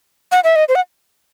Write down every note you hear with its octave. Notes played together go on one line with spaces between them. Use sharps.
F#5
E5
D#5
C5
F#5